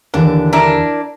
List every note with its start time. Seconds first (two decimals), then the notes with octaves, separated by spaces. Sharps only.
0.14 D#2 D3 E3 D4
0.53 D4 E4 A#4